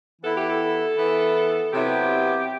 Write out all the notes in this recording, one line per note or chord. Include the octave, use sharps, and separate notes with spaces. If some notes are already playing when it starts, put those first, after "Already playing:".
E3 B3 E4 A4
G4
A4
E3 B3 E4
C3 F#3 B3 E4 G4